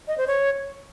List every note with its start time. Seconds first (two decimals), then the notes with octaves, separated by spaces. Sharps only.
0.08 D#5
0.18 C5
0.27 C#5